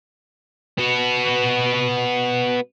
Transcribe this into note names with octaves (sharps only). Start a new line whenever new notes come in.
B3 F#4